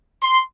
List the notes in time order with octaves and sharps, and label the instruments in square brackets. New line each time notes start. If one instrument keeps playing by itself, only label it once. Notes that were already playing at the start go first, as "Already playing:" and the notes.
[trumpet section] C6